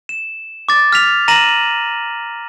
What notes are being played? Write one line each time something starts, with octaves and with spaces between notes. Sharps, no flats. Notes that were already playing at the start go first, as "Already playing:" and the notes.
E7
D6 A6
F6 B6 F7
A#5 A#6 D#7 E7 F#7